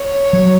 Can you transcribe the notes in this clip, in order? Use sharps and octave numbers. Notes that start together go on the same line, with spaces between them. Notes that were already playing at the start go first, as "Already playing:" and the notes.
Already playing: C#5
F#3